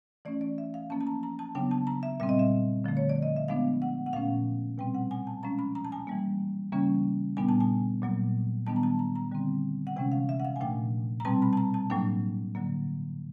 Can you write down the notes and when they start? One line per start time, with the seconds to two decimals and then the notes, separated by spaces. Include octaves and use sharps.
0.25 E3 A3 C#4 D5
0.41 D5
0.58 E5
0.74 F5
0.90 F3 A#3 C#4 A5
1.01 A5
1.07 A#5
1.23 A#5
1.39 A5
1.55 C#3 F#3 B3 D4 G5
1.71 A5
1.87 A#5
2.03 E5
2.20 A#2 G3 C4 E5
2.29 D#5
2.39 E5
2.84 D3 F3 A3
2.97 C#5
3.10 D5
3.23 D#5
3.36 E5
3.48 F3 G#3 B3 D4 F5
3.82 F#5
4.06 F#5
4.13 A#2 F3 A3 C#4 F5
4.78 B2 G3 C4 G5
4.94 F#5
5.11 G#5
5.27 A5
5.43 F3 G#3 C#4 A#5
5.59 B5
5.75 A#5
5.85 A5
5.92 G#5
6.07 E3 G3 A#3
6.72 C#3 E3 G3 A#3 C#4
7.37 A#2 G3 B3 D4 G#5
7.49 A5
7.60 G#5
8.02 A#2 F#3 A#3
8.67 D#3 G3 B3 D4 A5
8.76 A#5
8.83 A5
8.99 A#5
9.15 A#5
9.31 D3 G3 C4
9.87 F#5
9.96 C3 E3 G#3 C#4 G5
10.12 F5
10.29 E5
10.40 F#5
10.45 F5
10.56 G#5
10.60 A#2 F3 A3 D4 G5
11.20 A#5
11.25 B2 G3 C4 A5
11.42 B5
11.53 A5
11.57 A#5
11.74 A5
11.90 A2 F#3 A#3 D4 G5
12.55 D3 F#3 A#3